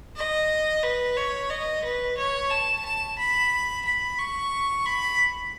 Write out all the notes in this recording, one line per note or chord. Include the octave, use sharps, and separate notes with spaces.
D#5
B4
C#5
D#5
B4
C#5
A5
A5
B5
B5
C#6
B5